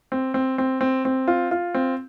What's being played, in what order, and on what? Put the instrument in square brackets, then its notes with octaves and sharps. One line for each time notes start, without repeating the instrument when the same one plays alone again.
[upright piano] C4
C4
C4
C4
C4
F4
F4
C4